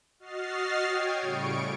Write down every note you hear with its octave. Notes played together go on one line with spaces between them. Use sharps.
F#4 D#5 F6 A6 C7
C#5 G5 D#6 G#6
A2 C#3 G3 C#6 D7